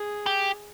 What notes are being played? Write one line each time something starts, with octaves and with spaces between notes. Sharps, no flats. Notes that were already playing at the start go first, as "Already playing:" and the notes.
Already playing: G#4
G4